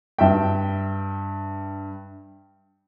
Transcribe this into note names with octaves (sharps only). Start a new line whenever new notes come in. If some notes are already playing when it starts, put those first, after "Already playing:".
G2 E5 G5